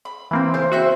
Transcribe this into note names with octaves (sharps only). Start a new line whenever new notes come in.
B5
E3 A#3 C4
C#3 E4 C5 G6
F#4 C5 E5 G5